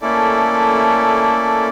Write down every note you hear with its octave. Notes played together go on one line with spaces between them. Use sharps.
A3 A#3 C#4 E4 A4 D5